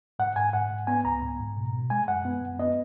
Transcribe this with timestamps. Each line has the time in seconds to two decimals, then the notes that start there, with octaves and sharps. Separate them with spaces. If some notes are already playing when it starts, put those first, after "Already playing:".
0.19 G#2 F#5
0.36 G#2 G#5
0.53 G#2 F#5
0.71 G#2
0.87 B3 G#5
1.05 C#2 A#5
1.22 G#2
1.39 G#2
1.57 B2
1.73 B2
1.90 G#3 G#5
2.08 F#2 F#5
2.25 B3
2.41 F#2
2.59 B3 D#5